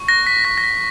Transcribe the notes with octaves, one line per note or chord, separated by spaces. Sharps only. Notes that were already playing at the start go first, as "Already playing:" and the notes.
Already playing: C#6
F#6 A#6
B6
C#6 A#6
A#6
B6